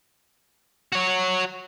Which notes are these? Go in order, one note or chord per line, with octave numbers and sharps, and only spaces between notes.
F#4 C#5